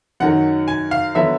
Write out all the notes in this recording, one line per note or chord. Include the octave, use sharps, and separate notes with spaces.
F#2 D#3 F#3 F#5
G#5
F5
D3 F#3 B3 E5